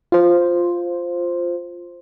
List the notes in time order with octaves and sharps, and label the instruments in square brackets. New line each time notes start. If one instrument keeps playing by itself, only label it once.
[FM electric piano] F4 C5